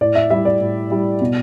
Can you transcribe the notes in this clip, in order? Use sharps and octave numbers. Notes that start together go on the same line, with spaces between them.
A2 D5
E5
G3 E4 E5
D5
A2
G3 E4
B2